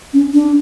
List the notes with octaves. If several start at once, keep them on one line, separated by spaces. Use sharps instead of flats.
C#4
D4